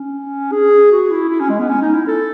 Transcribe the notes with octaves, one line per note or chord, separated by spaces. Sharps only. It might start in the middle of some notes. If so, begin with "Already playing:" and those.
Already playing: C#4
G#4
F#4
E4
E4
C#4
G#3
B3
C#4
D#4
E4
A4